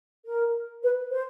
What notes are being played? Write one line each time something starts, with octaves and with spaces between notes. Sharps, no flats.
A#4
B4
C5